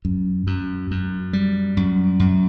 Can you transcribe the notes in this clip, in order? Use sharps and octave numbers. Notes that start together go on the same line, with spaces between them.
F#2
F#2
F#2
G3
F#2
F#2